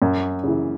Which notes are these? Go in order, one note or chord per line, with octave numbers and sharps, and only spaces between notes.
F#2
C#3 E3